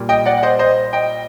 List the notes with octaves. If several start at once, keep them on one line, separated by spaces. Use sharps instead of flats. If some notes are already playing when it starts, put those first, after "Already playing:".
Already playing: A#2 G3
D#5 G5
D5 F#5
F#5
C5 D#5
C5 D#5
D#5 G5